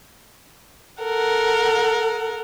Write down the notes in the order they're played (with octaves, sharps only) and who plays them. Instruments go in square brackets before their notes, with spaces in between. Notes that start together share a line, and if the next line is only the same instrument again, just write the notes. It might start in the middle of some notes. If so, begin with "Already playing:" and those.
[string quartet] A4 A#4 F#5